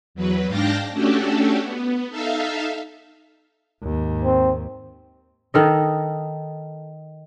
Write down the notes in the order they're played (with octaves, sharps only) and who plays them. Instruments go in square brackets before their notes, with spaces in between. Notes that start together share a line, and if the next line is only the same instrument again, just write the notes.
[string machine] E2 F#3 B4
G#2 D4 F5 G5 A5 A#6
A3 C#4 D4 F#4 G4 A4
B3
D#4 A4 E5 F5
[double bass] D#2 G#2
[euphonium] C4
[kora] D#3 A4 D#5